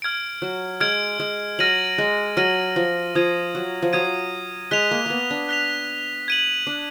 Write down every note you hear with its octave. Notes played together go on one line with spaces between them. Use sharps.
F6 G#6 D7
F#3
G#3 F6 G#6 D7
G#3
F#3 F6 A#6 D#7 F#7
G#3
F#3 F6 A#6 D#7 F#7
F3
F3 D#6 G#6 D#7
F#3
F3
F#3 D#6 G#6 D#7
G#3 F#6 B6 F7
A#3
A#3 B3
D4
F#6 B6 F7
G#6 D#7 F#7
D4